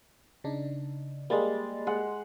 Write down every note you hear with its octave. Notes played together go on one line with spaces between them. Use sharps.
C#3 D4 D#4
G3 G#3 A#3 A6
G#3 F#5